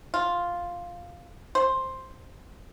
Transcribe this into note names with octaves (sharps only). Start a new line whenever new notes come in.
F4
C5